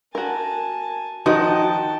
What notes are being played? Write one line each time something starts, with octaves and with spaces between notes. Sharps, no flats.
F#4 A#4 G#5 A5
D#3 F3 D#4 F#4 D#5 G5 A5